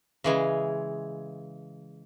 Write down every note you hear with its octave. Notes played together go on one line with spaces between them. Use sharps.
C#3 E3 G#3